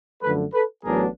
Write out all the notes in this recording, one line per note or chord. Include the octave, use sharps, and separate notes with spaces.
F#2 D3 F3 A3 A4 B4
A4 B4
A1 A2 F#3 B3 D4 G#4 A#4